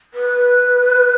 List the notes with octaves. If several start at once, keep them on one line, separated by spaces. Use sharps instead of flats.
B4